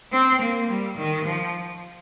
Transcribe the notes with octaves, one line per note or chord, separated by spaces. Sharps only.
C4
A#3
G3
D#3
F3